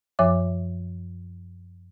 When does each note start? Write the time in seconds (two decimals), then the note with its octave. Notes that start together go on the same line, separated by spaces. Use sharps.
0.19 F#2 F3 C#5 E5 D6